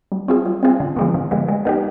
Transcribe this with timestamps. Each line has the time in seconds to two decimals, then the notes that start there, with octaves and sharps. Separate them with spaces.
0.12 G3
0.28 C4 F4 G#4
0.46 G3
0.63 C4 F4 G#4
0.80 D3
0.96 F3 G#3 B3
1.14 D3
1.31 F3 G#3 B3
1.48 G#3
1.65 B3 D#4 G4